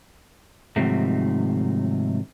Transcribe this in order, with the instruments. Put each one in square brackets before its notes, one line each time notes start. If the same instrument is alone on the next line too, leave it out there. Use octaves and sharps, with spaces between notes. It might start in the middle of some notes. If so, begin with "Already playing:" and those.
[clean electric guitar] G#2 C3 D#3 F3 F#3 A3